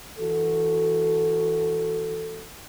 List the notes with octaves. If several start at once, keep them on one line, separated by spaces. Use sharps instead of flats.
E3 F#4 A4